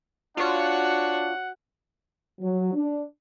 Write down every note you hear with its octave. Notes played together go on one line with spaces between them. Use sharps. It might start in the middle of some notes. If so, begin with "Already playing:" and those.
D4 F4 F#4 C#5 F#5
F#3
D4